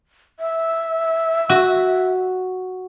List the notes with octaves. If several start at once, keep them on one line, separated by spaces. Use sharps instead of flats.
E5
F#4